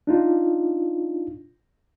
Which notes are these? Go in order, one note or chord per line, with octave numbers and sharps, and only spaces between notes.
D4 D#4 F4